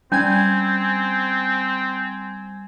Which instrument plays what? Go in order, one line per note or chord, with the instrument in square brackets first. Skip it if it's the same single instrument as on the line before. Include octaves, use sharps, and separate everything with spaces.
[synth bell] G3 G#5 G#6 [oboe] C4 [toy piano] C#4